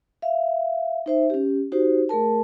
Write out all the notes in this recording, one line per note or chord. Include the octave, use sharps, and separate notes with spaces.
E5 F5
D#4 C5 E5
C#4 G4
D#4 F#4 G4 C5
A3 G#4 A#4 A5